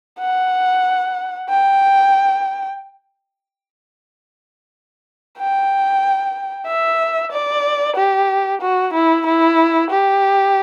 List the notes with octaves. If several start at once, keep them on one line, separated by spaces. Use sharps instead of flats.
F#5
G5
G5
E5
D5
G4
F#4
E4
E4
G4